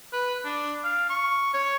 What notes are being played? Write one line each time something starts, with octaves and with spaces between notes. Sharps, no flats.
B4
D4
F5
C#6
C#5